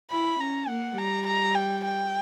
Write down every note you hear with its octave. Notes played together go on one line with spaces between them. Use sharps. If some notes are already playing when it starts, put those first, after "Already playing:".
E4 B5
C#4 A#5
A#3 F#5
G3 A#5
A#5
G5
G5